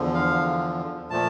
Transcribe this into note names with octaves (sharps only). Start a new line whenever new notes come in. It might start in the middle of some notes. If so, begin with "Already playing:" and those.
Already playing: E2 D3 F3
F5
A#2 F3 A3 A5